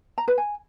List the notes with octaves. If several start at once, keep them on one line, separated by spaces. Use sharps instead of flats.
A#5
B4
G#5